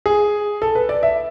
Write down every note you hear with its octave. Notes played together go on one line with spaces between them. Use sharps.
G#4
A4
B4
D5
E5